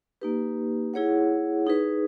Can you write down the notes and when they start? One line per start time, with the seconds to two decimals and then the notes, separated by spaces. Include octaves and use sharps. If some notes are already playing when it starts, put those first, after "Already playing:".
0.21 A#3 D#4 G4 B4
0.94 E4 G#4 C#5 F#5
1.67 D#4 G#4 B4